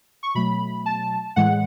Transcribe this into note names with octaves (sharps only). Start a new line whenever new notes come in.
C#6
B2 F#3 A3 B5
A5
A2 E3 G#3 F#5